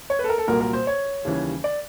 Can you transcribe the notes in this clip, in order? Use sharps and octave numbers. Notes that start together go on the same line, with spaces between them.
C#5
B4
A4
A#4
A4
C2 A#2 F#3 A#3 A#4
A#4
C5
C#5
D#2 C#3 E3 G3
D5